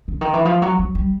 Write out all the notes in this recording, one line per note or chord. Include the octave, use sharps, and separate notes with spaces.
D3
D#3
E3
F3
F#3
F#3
G3